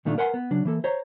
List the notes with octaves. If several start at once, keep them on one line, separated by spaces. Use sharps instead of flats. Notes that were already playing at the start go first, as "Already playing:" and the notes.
A#2 D#3 A3 D4 F4
A#4 B4 F#5 G#5 C6
B3
C#3 F#3 D4
E3 A#3 A4
C5 C#5 A#5